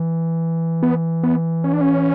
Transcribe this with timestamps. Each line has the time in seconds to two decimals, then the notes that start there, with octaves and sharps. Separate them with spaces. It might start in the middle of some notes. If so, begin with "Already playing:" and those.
Already playing: E3
0.83 B3
1.23 B3
1.64 C#4
1.73 D4
1.81 C#4